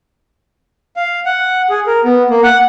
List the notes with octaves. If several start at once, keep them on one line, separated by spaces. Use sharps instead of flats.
F5
F#5
G#4
A#4
B3
A#3
F#5